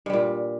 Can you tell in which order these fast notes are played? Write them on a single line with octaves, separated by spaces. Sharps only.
G2 G3 A#2